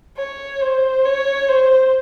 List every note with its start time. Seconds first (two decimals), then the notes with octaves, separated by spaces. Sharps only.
0.17 C#5
0.61 C5
1.05 C#5
1.49 C5